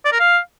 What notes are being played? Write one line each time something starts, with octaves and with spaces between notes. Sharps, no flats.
D5
A#4
F5